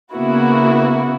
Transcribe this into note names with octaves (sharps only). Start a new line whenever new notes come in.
C#3 A#3 B3 E4 F#4